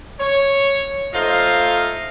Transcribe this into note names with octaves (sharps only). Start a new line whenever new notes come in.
C#5
A3 D#4 F4 C5 D#5 F5